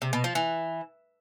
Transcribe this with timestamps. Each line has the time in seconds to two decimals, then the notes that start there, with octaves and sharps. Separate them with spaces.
0.02 C3
0.13 B2
0.24 F3
0.35 E3